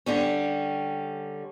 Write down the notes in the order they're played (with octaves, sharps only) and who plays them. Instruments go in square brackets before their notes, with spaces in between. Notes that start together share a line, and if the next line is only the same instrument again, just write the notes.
[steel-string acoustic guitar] D3 G3 C#4 G4